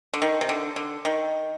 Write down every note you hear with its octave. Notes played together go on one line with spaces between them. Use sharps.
D3
D#3
C3
D3
D3
D#3